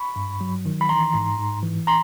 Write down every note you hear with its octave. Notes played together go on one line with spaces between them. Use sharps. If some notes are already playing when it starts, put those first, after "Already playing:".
Already playing: B5 C#6
G2
F#3
D#3
B5
E3 A#5 C6
G#2
G#2
E3
A#5 C6